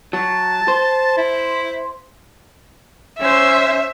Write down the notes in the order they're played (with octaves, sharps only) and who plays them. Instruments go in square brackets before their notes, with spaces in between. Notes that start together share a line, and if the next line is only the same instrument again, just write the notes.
[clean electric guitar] F#3 [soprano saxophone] A5
[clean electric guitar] C5
[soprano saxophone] E4
[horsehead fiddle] C#4 C5 [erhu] E5